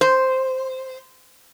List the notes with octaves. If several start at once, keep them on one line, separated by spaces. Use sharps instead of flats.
C5